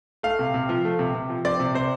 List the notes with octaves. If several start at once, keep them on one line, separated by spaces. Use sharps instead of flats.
A3 F5
C3
C3
F3
A3
C3
C3
F3
C4 D5
C3
C3 C5